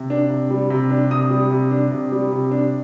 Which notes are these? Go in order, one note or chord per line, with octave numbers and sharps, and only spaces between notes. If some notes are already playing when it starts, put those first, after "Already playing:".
Already playing: C3
D4
C3
G3
C3
D4
C3 D#6
G3
C3
D4
C3
G3
C3
D4